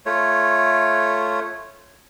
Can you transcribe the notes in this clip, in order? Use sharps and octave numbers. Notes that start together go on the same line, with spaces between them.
A3 F4 C#5